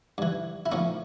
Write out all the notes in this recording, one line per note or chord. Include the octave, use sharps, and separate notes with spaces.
G2 E3
E4
A2 F3 C#4 D#4